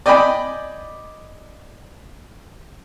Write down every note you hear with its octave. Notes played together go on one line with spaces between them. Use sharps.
D5 D#5 G5 G#5 B5